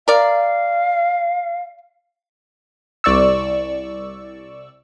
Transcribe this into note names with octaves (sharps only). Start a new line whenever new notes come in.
A#4 D5 F5
C2 D5 C#6 E6